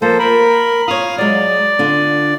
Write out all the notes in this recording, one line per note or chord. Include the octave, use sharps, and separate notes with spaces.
F3 A#3 A4 C5
A#4 B5
F4 C#5 F5 D#6 F6
F#3 G#3 D5
D3 D4 F4